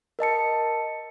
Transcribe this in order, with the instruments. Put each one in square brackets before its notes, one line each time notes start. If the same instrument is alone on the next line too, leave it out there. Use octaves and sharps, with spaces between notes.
[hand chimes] A#4 D#5 A5 C#7